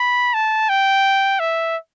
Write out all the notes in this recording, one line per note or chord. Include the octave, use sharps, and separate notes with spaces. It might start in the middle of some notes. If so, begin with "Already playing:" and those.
Already playing: B5
A5
G5
E5